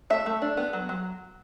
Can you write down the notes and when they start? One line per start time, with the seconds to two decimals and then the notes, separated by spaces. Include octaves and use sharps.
0.10 A3 E5
0.26 A3
0.42 D4
0.57 B3
0.73 F#3
0.89 F#3